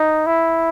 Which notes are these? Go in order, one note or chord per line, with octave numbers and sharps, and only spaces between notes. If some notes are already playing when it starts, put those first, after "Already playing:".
Already playing: D#4
E4